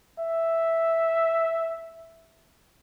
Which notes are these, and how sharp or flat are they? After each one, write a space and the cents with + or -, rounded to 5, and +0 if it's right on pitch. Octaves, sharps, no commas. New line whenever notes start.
E5 +0